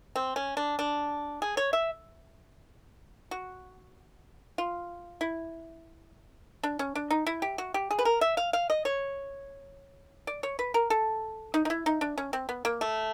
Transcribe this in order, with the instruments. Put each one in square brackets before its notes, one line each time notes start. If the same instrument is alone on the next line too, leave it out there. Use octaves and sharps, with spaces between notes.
[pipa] C4
C#4
D4
D4
G#4
C#5
E5
F#4
F4
E4
D4
C#4
D4
D#4
E4
G4
F#4
G4
G#4
B4
A#4
E5
F5
F5
D#5
C#5
D5
C#5
B4
A#4
A4
D#4
D#4
E4
D#4
D4
C#4
C4
B3
A#3
A3